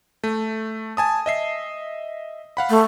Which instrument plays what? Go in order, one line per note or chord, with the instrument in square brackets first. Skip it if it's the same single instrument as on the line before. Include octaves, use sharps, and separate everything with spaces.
[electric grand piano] A3
G#5 A5 D#6
D#5 E5 C7
F5 F#5 B5
[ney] A3